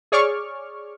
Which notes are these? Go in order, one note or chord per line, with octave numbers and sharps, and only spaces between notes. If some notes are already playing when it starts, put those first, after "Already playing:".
G#4 C#5 D5 C#6 D6 F6